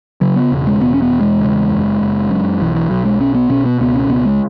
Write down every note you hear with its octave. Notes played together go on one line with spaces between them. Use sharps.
C#3 F#3
B3
E1
G#3
E1 B3
C#4
B3
E2
G#3
C#3
F#1
F#1
F#2
B1 E3
E3
B1 F#3
G#3
B2 C#4
B3
B2 C#4
B3
C#2 B3
C#4
C#2 B3
G#3